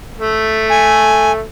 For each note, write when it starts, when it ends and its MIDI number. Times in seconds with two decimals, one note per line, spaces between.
0.18 1.44 57
0.70 1.32 80